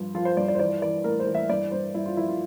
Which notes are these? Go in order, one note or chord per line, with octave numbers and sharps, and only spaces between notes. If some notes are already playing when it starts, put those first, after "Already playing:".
Already playing: G2 F3
F3 F4
C5
G2 D5
D5
C5
E3 D5
E3 D5
A2 A#4
C5
E3
E5
G2 D5
G2 C5
G2 E4
F4
F3 E4
F4